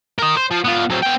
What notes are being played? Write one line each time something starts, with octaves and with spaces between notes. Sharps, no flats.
A#4 D#5
C5
F3
B3 F4
F#3 C4
B3 G5